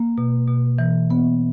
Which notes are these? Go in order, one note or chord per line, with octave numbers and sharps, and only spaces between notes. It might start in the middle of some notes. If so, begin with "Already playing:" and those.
Already playing: A#3
B2
B2
E3
B3